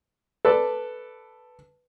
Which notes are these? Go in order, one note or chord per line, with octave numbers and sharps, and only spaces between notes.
A4 B4 D5